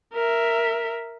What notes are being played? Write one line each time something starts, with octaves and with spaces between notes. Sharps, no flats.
A#4 E5